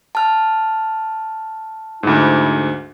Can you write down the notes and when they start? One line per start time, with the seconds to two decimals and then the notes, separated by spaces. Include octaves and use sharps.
0.15 A5 F6
2.03 D2 G#2 E4